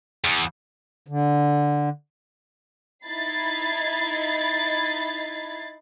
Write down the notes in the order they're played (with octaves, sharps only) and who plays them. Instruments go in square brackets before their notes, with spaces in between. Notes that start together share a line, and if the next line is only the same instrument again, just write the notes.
[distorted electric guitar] E2
[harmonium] D3
[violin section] D#4 E4 B5 G#6 A6 C7